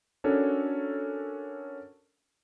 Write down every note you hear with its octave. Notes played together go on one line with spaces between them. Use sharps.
C#4 D4 F#4 A4 A#4 C#5